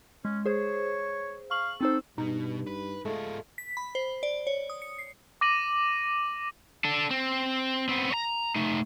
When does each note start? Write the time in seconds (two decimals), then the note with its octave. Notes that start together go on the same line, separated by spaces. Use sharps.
0.25 G#3 C#4
0.46 G#4 C5 C#5
1.51 F5 C#6 F#7
1.81 C4 D#4 A4 C5
2.18 G2 B2 D#4
2.67 B4
3.05 G#2 G#3 A3 F4
3.58 B6
3.77 B5
3.95 C5
4.23 D5
4.47 C#5
4.70 D#6
4.82 C#7
4.98 C7
5.41 D6 A#6 D#7 F#7
6.85 D4 A4
7.11 C4
7.89 B3 C4
8.11 C#5 A#5
8.56 A3 D#4